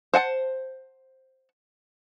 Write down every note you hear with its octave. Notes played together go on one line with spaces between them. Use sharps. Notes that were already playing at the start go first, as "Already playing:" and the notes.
C5 F#5 G#5 A5